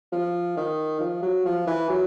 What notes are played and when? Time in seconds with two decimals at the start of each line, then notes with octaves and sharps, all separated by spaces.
0.12 F3
0.57 D#3
1.00 F3
1.22 F#3
1.45 F3
1.67 E3
1.89 F#3